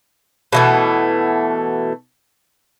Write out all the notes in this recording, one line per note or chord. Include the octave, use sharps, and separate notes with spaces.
B2 E3 A3